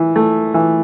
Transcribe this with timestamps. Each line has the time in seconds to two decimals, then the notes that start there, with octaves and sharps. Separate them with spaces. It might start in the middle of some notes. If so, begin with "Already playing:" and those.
Already playing: E3
0.16 A3
0.54 E3